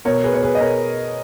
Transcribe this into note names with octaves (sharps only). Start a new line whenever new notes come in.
B2 A#4 C#5
G#4 B4
B2 C#5
G#4 B4
D#5
B2 A#4 C#5